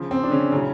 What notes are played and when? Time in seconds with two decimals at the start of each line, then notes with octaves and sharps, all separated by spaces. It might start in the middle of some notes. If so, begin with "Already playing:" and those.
Already playing: C#3 F3
0.11 C4
0.23 D4
0.31 C#3 C#4
0.51 A2 C#3 F#3 C#4